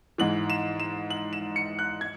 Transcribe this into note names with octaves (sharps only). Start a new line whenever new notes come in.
G#2 E3 F#7
E7
E7
F#7
E7
C#7
F#6
G#6